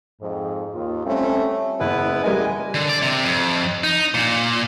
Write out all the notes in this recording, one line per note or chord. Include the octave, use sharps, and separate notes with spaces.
F2 G#2
D#2 F4
G3 A3 C4 C#4
F#1 B3 E4 B4
G3 G#3 A#4 D#5 G#5
D3
D5
C3
F2
D#4
A#2